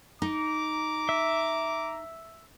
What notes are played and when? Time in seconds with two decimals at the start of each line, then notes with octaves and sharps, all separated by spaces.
0.22 D#4 A#5 D6
1.09 E5